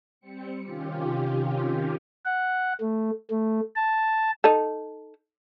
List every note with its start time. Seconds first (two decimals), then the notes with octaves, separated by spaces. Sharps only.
0.20 G3 C4 C#7
0.61 C3 D#3 C#4 F4 G4
2.25 F#5
2.81 A3
3.31 A3
3.76 A5
4.44 D#4 A4